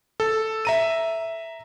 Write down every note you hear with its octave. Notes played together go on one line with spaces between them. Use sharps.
A4
E5 A#5 D#7